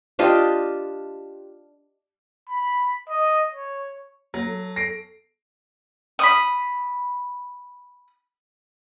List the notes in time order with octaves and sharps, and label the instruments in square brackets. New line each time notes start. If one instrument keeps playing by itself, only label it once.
[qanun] D4 F4 G4 D#5
[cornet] B5
D#5
C#5
[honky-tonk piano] F#3 [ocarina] A#3
[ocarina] A4
[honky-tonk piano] A#6 C7 D7
[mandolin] B5 D6 D#6